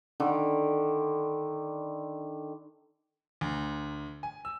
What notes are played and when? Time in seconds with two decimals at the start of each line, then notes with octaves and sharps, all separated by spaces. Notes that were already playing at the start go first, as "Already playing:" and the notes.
0.20 D3 D#3
3.41 D2
4.23 G#5
4.45 E6